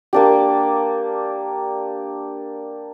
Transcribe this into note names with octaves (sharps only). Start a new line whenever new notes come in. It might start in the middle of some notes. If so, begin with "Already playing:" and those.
A#3 D4 G4